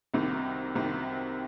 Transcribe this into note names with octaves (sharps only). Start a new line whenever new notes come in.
C2 C3 D#3
C2 C3 D#3